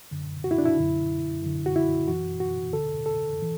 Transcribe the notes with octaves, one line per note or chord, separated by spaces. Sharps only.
F#2 D3
F#4
E4
D4
E4
F#2 D3
F#2 D3
F#4
E4
F#2 E3 F#4
F#4
D2 D3 A4
A4
E3